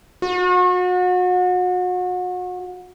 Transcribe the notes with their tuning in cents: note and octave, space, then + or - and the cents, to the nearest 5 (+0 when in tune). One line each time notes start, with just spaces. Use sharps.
F#4 -35